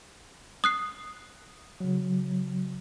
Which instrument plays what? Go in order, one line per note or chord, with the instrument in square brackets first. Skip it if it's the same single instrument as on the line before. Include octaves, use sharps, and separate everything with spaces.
[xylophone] D#6 F#6 C7
[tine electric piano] C#3 F#3